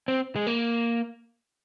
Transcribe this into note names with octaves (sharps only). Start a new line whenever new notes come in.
C4
G#3
A#3